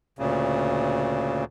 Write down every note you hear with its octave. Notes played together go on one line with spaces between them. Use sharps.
D2 A#2 C#3